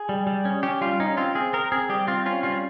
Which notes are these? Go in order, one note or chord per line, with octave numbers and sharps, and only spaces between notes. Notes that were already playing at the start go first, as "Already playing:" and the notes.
Already playing: G#4
G3
G3
C#4
C#4 G4
G3 F4
C#4 D#4
C4 F4
C4 G#4
C4 A#4
C4 G#4
G3 G4
C4 F4
C#4 F4
G3 F4